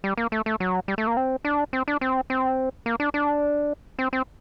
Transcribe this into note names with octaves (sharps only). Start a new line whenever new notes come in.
G3
A#3
A3
A3
F#3
G3
A3
A#3
C4
D4
C4
D4
C4
C4
A#3
D4
D4
C4
C4